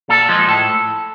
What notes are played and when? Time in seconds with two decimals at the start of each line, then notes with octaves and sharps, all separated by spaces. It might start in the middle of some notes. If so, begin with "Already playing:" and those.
0.09 A#2 A4
0.29 F3 G#3
0.48 A2 A4